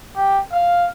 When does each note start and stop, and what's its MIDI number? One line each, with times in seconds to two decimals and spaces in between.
0.16 0.39 67
0.52 0.88 77